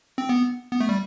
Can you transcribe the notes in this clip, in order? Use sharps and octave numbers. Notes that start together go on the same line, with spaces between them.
C4
B3
B3
A3
G3